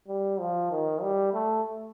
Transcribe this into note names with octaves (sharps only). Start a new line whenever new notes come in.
G3
F3
D#3
G3
A3